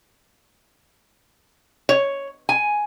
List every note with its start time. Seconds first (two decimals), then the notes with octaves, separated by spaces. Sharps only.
1.89 C#5
2.49 G#5